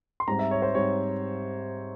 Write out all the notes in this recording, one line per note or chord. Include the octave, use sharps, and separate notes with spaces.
C6
G#2 G3 C4 A#5
E5
C#5
C5
G#2 G3 C4 C#5